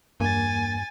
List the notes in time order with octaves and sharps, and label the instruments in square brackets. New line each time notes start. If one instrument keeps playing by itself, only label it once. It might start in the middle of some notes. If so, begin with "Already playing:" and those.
[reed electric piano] E2 A#3 [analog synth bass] G2 [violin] G#5 A6